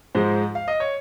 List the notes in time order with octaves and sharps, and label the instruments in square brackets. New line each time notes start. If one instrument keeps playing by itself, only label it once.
[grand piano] G#2 F3 G#3 C5
F5
D#5
C#5